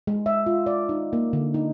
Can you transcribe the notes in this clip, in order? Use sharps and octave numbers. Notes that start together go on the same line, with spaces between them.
G#3
E5
F4
D5
D#4
A#3
D3
D#4